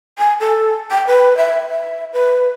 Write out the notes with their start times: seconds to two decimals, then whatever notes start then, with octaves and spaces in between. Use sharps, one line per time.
0.18 G#5
0.40 A4
0.91 G5
1.07 B4
1.37 E5
1.70 E5
2.13 B4